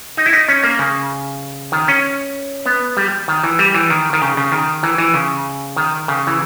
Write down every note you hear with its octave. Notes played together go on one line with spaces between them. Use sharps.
D#4
E4
D#4
C#4
A#3
C#3
D#3
C#4
B3
G3
D#3
E3
G3
E3
D#3
D#3
C#3
C#3
D#3
E3
E3
C#3
D#3
C#3
E3